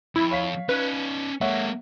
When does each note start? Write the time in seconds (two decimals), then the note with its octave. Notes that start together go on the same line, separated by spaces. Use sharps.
0.16 F2 E4
0.31 C#5 F5 B6
0.69 C#4 D#4 B4
1.41 G#3 A#3 C#5 E5 F#5